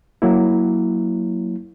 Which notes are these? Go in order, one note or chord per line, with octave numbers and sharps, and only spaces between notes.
F#3 A#3 E4